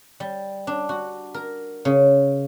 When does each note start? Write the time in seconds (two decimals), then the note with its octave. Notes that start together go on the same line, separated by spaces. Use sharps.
0.20 G3
0.67 D4
0.89 F#4
1.34 A#4
1.85 C#3